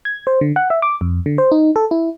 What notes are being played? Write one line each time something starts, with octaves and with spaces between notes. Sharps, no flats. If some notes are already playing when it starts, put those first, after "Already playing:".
G#6
C5
D3
F#5
E5
D6
F2
D3
C5
D#4
A4
E4